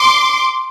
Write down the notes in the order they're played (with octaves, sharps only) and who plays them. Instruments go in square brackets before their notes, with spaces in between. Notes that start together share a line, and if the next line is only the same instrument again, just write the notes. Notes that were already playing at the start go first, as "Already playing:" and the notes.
Already playing: [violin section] C6 D6